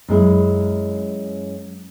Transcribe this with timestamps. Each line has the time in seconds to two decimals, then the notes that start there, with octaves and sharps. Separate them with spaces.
0.09 F#2 G#3 E4